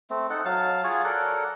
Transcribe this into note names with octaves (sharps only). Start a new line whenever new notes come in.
A3 C4
D#4 A4 F#5
F#3 F5 A5
F4 F#4 G#4 C#5
A4 A#4 D5 F#5